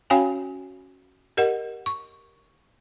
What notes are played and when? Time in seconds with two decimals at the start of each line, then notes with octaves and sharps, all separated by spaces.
0.10 C#4 F#4 C#5 F5 G5 G#5
1.37 G4 A#4 D#5 F#5
1.86 C#6